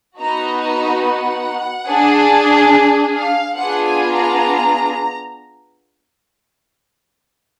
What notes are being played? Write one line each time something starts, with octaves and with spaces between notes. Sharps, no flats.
B3 D#4 F#4 A#5
A#5
F#5
D4 G#4
F5
B3 D4 F4 G#4 F#5
G#5
A#5